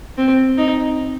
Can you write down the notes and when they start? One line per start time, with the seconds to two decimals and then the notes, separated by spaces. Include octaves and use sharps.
0.18 C4
0.58 D#4